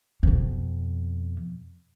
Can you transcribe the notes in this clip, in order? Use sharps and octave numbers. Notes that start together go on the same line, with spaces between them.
F2 B2